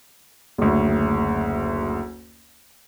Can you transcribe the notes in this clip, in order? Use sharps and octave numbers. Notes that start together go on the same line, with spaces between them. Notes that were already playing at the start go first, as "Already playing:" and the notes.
F#1 D2